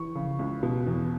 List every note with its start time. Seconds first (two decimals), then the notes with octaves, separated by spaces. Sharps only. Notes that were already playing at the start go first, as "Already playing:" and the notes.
Already playing: E3 C#6
0.15 C#3
0.39 C#2
0.63 B2
0.87 E2